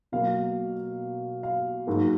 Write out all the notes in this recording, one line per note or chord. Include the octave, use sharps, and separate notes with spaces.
B2 F#3 A#3 F5
F5
G#2 F#3 A#3